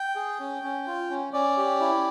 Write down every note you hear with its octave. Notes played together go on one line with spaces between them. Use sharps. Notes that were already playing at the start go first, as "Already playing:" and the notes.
Already playing: G5
G#4
C#4
C#4
F4
C#4
C#4 D5
G4
E4